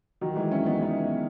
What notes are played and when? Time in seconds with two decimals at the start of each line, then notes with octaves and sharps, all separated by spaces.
0.21 D#3 F#3
0.36 E3 G#3
0.52 C#4 E4
0.66 B3 D#4
0.81 B3 D#4